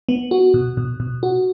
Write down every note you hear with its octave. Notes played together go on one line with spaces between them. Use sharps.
B3
F#4
B2
B2
B2
F#4